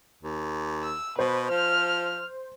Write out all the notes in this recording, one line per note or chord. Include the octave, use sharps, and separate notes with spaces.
D#2
E6
B2 B4 C5
F3 F6